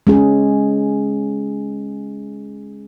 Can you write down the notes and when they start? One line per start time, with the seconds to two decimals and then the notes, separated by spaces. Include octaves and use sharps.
0.07 G#3 C#4 G#4